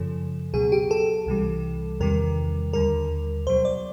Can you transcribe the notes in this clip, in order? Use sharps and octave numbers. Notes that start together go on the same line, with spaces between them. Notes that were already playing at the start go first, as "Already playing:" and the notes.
Already playing: F#2 C#3 F3 A4
C#2 B2 F#3 G#4
G4
A4
C2 C3 E3 G3
E2 C3 D#3 G3 A#4
D#2 D3 G3 A#4
C#2 B2 F#3 C5
D5